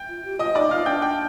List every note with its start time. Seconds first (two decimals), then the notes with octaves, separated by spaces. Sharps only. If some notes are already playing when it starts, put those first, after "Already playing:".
Already playing: G5 G6
0.09 F4
0.25 G4
0.39 F4 D#5 D#6
0.55 D#4 D5 D6
0.71 F4 F5 F6
0.86 D4 G5 G6
1.02 G5 G6